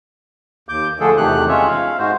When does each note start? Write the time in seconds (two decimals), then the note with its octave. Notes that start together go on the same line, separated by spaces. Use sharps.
0.69 D#2 D6 G6
1.00 D3 F3 A3 D4 G#4 A4
1.17 E2 C3 D#3 A3 G4 F#6
1.48 G#3 C#4 F4 C#5 E5
1.69 F5
1.98 G#2 G#3 F#4 C5